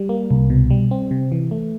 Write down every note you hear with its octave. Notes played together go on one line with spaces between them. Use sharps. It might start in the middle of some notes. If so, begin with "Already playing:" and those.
Already playing: G3
A#3
C2
B2
G3
C4
C3
E3
A3